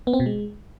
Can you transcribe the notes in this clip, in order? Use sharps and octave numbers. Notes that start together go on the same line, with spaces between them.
B3
C4
B2
G#3